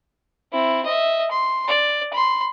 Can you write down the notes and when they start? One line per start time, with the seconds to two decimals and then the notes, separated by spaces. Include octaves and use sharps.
0.52 C4 E4
0.85 D#5 E5
1.31 C6
1.68 D5
2.13 B5 C6